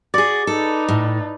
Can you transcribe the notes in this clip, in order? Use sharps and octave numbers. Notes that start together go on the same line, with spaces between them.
F#4 G#4 D5
D#4 A4 B4
A2